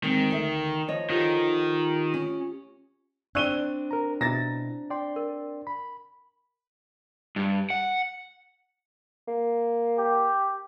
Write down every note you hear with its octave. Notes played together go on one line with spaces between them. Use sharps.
D#3 G#3 C4
D2 E5
F3 C#5 D#5
D#3 F4 G4
C#4
C4 D4 D5 C#6 E6 F#6 D#7 G7
A#4 A#5
B2 E4 A#5 A6 A#6
D5 G5 C6
A#4
B5
G2
F#5
A#3
G4